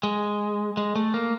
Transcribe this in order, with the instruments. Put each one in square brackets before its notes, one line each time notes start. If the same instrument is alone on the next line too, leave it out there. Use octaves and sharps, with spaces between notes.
[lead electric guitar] G#3
G#3
A3
A#3